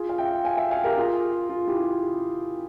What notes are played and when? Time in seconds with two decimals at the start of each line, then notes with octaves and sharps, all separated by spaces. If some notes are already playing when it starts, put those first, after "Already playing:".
Already playing: F4 G#4
0.09 F5
0.18 E5 G5
0.45 F5 G#5
0.57 E5 G5
0.71 F5 G#5
0.84 G4 A#4
0.98 F4 G#4
1.49 F4
1.68 E4 G4